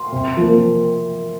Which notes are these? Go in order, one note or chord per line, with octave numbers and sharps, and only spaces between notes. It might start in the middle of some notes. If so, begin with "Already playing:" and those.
Already playing: C6
C3
F3 A#3